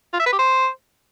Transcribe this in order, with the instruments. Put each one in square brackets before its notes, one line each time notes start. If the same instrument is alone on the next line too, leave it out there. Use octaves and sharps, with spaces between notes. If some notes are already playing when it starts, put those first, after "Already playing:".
[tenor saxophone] F4
E5
B4
G4
C5